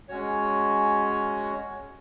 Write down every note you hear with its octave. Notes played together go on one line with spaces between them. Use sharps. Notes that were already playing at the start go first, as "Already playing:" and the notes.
G#3 C#4 F#4 C#5